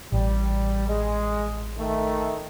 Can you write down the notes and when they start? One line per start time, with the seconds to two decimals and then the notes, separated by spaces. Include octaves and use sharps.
0.12 A1 G3
0.88 G#3
1.78 D#3 A3